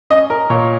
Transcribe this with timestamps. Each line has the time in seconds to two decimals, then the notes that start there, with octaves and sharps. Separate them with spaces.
0.10 C#4 D#5
0.30 A#4
0.50 A#2 C#5